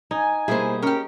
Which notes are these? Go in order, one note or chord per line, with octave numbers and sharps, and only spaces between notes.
D#4 G#5
B2 G3 A#3 E4 G#4 C5
C#4 G4 A#4